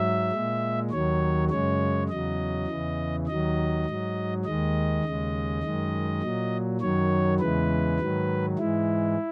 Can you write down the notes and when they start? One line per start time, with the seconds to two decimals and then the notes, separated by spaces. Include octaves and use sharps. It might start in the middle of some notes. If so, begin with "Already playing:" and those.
Already playing: G#2 F#3 E5
0.32 A#2 G#3
0.91 D#2 D#3 F#3 C#5
1.50 F#2 C#3 G#3 C#5
2.09 E2 C#3 F#3 D#5
2.67 E2 C#3 E3
3.27 D#2 D#3 F#3 D#5
3.86 G#2 F#3
4.45 D#2 D#3 G#3 D#5
5.04 D#2 C#3 G#3
5.63 F#2 D#3 G#3
6.22 A#2 F#3
6.81 F#2 D#3 F#3 C#5
7.40 E2 C#3 E3 G#3 B4
8.00 G#2 D#3 F#3
8.58 G#2 E3 G#3 E4